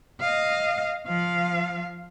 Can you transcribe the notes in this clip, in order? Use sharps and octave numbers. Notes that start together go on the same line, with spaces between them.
D#5 F5
F3 F5